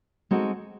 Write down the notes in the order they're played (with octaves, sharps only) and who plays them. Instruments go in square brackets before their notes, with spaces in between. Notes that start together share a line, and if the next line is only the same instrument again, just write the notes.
[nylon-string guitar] G#3 C4 D#4 F#4 A4